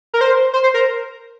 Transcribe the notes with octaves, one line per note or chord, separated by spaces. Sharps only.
A#4
C5
C5
C5
A#4